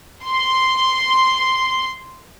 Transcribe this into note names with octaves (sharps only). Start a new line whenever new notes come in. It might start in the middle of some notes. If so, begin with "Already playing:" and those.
C6